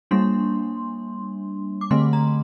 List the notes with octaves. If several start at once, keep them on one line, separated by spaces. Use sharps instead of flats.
G3 A#3 D4 C6
D6
D3 A3 C4 C6
A#5